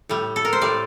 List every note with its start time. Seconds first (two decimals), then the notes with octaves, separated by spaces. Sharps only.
0.09 A2 G3
0.36 A4
0.45 A#4
0.53 C5
0.61 A2 G3 D5